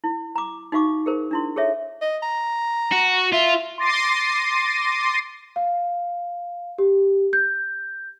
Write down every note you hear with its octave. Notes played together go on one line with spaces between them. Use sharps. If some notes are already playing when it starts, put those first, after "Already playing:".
E4
A#5 D6
D#4 F#4 F5 C#6 D6
G#4 A#4 C5
D4 E4 C6
G#4 A4 C#5 E5
D#5
A#5
F#4
F4 E5
C6 D6 A6 A#6 C7 D#7
F5
G4
G6